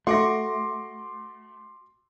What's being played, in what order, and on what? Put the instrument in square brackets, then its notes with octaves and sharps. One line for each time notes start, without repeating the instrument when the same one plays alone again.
[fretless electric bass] A3 [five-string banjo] F#4 [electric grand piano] C6 D6 A#6